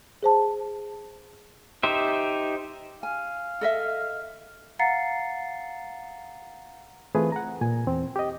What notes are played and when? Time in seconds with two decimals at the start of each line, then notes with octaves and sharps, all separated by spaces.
0.23 G#4 C5 A5
1.83 D#4 G4 C5 E5
3.03 F5 G#5
3.61 A4 D#5 E5
4.79 F5 F#5 A#5 A6 C7 C#7
7.15 E3 A3 C4 F4 G#4 B4
7.32 F#5 A#5
7.61 A#2 G#5
7.87 E2 C4
8.16 G4 D#5